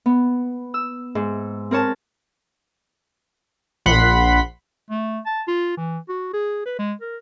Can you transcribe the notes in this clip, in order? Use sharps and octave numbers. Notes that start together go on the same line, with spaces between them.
B3
E6
G#2
C4 A#4 C#5 A5
A#1 F#5 B5 C6 B6
A3
A5
F4
E3
F#4
G#4
B4
G#3
A#4